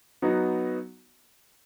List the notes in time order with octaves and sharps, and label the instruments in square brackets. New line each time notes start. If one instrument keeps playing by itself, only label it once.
[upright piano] F#3 B3 D#4 F#4